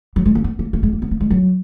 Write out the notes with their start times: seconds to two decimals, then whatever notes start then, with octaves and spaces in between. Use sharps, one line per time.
0.16 F#3
0.26 G#3
0.35 A#3
0.44 B3
0.59 A#3
0.73 A#3
0.83 G#3
0.93 A#3
1.02 B3
1.11 A#3
1.21 G#3
1.30 F#3